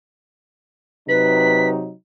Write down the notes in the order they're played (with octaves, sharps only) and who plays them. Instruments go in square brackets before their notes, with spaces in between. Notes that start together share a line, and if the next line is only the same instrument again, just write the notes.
[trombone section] C3 F#3 D#4 [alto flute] B4 [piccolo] B6